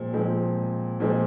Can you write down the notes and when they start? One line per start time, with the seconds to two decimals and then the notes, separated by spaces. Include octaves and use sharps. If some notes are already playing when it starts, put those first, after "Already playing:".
Already playing: A#2 F3 G#3 C4
0.13 A#2 F3 G#3 C4
1.00 A#2 F3 G#3 C4